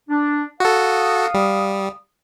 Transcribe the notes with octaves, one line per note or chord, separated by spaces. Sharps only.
D4
F#4 A4 F5 D#6
G3